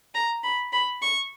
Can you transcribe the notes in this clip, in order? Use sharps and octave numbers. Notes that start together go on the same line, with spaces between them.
A#5
B5
B5
C#6